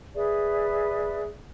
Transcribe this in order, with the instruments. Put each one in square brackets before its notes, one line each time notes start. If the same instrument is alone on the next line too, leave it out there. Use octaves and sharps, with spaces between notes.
[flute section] G#4 B4 D5 E5